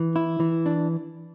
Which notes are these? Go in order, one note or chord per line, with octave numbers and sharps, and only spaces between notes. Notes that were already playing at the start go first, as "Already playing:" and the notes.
Already playing: E3
E4
E3
D4